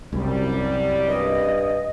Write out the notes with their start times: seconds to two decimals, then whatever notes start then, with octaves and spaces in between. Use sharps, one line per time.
0.13 C2 F#2 G3
1.08 G2 D#5